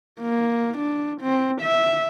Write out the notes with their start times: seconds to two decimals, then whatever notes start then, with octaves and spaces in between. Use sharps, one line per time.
0.21 A#3
0.78 D4
1.21 C4
1.61 E5